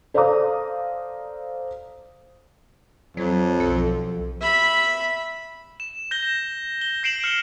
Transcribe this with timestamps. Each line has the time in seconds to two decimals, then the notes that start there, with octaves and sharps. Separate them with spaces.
0.14 A4 C5 D5 F5 A#5 D#6
3.17 F2 F#3
3.60 B1 F3 A4
4.41 E5 B5
5.80 E7
6.11 G6 A#6 E7 G7
6.81 G7
7.03 G6 C7 D7 E7 F#7
7.24 F6 C#7 D7 G7